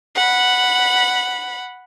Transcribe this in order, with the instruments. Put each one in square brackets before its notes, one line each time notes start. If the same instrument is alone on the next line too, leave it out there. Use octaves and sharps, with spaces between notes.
[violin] F#5 B5